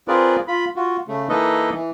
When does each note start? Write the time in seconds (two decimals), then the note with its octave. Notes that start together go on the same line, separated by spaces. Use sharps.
0.08 C4 F4 G#4 A#4 B4 D5
0.48 F4 B5
0.76 F4 F#4
1.08 C#3 A3
1.29 E3 A#3 D#4 A4 B4 D#5
1.73 E3